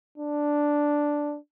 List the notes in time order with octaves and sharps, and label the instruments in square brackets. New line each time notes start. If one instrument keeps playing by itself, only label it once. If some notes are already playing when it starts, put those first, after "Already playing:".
[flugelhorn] D4